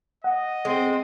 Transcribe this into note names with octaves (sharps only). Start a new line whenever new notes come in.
D#5 F#5
G#3 C4